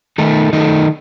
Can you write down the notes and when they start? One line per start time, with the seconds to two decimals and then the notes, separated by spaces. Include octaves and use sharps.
0.18 D#3 A3 D#4 A4
0.53 D#3 A3 D#4 A4